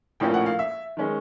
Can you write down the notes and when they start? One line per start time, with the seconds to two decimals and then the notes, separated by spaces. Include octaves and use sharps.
0.20 A#1 A2 F3 A#3 C#4 G5
0.34 F#5
0.46 F5
0.59 E5
0.97 D#3 G#3 C#4